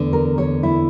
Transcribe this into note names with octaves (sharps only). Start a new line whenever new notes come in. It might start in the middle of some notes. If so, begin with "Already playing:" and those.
Already playing: E2 D3 A3
A#4
C#5
E4